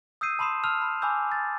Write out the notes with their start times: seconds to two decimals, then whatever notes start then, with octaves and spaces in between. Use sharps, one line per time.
0.21 D#6 E6 G6 C7 D#7
0.39 A5 B5 C6 D#6 C7 E7
0.64 A5 E6 F6 F7
0.82 B5
1.02 G#5 B5 D6 E6 G6
1.32 A6